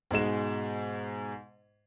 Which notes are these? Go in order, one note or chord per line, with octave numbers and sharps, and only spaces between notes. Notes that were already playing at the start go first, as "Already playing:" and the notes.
G#2 B2 G#3 E7